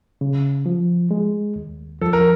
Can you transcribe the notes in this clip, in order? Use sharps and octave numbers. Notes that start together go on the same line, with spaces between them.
C#3
F3
G#3
D#2
F3 A4
A#4